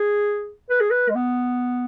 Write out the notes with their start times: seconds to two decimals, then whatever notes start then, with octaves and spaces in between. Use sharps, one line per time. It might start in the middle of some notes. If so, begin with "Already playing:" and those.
Already playing: G#4
0.70 B4
0.80 G#4
0.91 B4
1.10 G#3
1.15 B3